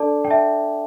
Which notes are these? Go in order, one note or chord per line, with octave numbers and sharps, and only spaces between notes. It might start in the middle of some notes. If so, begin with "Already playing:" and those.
Already playing: D4 A4 D5 A5 D6
G5
E5 A5